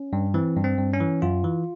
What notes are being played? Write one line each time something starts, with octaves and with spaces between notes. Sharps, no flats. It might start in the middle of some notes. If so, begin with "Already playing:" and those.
Already playing: C#4
G2
E3 C4
G2
C4
G2
C#4
E3
F#2 F4
E3